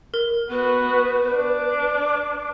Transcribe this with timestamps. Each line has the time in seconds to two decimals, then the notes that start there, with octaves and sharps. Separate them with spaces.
0.14 A#4
0.51 B3 F#4 B4
1.34 D4 D6